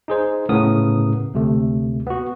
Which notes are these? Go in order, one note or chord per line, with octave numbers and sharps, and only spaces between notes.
D#4 G#4 C5
A2 C#3 B3 A#4 D#6
D2 C3 A3
B3 F#4